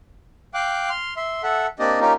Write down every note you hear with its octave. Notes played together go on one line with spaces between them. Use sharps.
F5 G5 D6 F#6
C6 F6
E5 C6
A4 E5 F#5
A#3 C4 D4 G4 D5 D#5
A#3 C#4 D#4 F4 G4 A#4